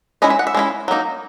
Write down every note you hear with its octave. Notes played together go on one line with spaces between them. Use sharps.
G#3 C#4 E4 D#5
E5
F#5
E5
G#3 C#4 E4
F#3 A#3 D#4